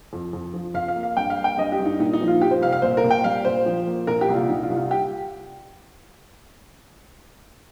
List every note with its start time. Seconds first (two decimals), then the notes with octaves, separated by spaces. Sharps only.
0.13 F2
0.33 F2
0.54 F3
0.74 F2 F5
0.88 F5
0.96 A#3
1.03 F5
1.17 G2 G5
1.30 F5
1.37 A#3
1.44 G5
1.58 G2 D#5
1.72 G4
1.79 G2
1.85 D#4
1.99 A#2 D#4
2.13 D#4
2.21 F3
2.28 F4
2.41 F3 G4
2.51 C5
2.62 C2 F5
2.72 F5
2.82 A#2 C5
2.97 A#4
3.04 A#2
3.10 G5
3.24 G3 F5
3.45 A#2 C5
3.66 F3
3.87 A#3
4.07 A#2 A#4
4.21 G4
4.29 C2
4.35 F4
4.49 C2 D#4
4.63 F4
4.70 C2
4.76 F4
4.91 G4